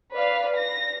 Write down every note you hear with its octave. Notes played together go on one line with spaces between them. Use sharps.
B4 D5 F5
A#6